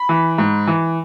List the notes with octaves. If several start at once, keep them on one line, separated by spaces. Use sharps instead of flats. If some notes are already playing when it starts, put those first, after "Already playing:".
Already playing: B5
E3
G#2
E3